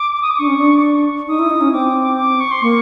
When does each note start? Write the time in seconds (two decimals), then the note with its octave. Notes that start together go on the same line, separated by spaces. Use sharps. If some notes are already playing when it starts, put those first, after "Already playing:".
Already playing: D6
0.22 D#6
0.30 D6
0.39 D4 C#6
0.47 C#4
0.57 D4
0.78 D6
0.83 C#6
1.28 D#4 D#6
1.39 E4
1.50 D#4
1.61 C#4
1.72 C4 D6
2.17 D6
2.40 C#6
2.51 C6
2.62 A#3 C#6